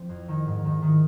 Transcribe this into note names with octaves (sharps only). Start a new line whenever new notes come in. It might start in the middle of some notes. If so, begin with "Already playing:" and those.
Already playing: F3 C4
F2
D#3
G#2
D#3
D#3